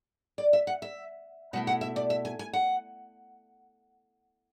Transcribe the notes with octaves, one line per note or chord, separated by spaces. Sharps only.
D5
E5
F#5
E5
B2 A3 E4 F#5
F#5
E5
D5
E5
G#5
G#5
F#5